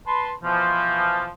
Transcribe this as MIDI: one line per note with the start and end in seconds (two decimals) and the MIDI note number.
0.06 0.31 71
0.06 0.31 81
0.06 0.31 83
0.06 0.31 84
0.43 1.28 47
0.43 1.28 52
0.43 1.28 53